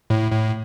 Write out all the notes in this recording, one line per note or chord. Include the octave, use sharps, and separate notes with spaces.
A2
A2